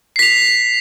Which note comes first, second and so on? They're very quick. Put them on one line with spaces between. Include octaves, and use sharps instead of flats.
C7 B6 F7